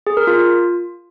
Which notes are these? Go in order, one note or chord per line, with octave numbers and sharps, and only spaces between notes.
G#4
A#4
F4